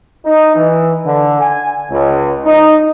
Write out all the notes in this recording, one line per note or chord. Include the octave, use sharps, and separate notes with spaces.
D#4
E3
D3
G#5
C#2
D#4